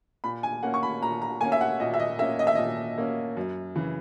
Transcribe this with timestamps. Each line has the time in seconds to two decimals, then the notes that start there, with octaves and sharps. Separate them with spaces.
0.24 A#2 B5
0.43 G#5
0.63 A#3 C#4 F#5
0.74 C#6
0.83 B5
1.02 A#2 A#5
1.22 A#5
1.41 A#3 C#4 G#5
1.52 E5
1.61 F#5
1.80 A#2 D#5
1.94 E5
2.00 D#5
2.19 A#3 C#4 E5
2.39 D#5
2.47 E5
2.55 A#2 D#5
2.98 A#3 C#4
3.37 F#2
3.76 C#3 E3